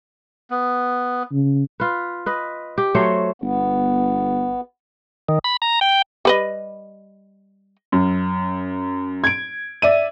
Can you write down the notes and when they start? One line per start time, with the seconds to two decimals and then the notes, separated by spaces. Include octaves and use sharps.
0.50 B3
1.32 C#3
1.80 F4 B4
2.26 B4 D#5
2.78 G4
2.95 F#3 A3 C5 C#5
3.42 G1 B3
5.29 D#3
5.44 B5
5.62 A#5
5.81 G5
6.25 G3 B4 D#5
7.92 F#2
9.24 G#6 D7
9.82 D5 E5 D#7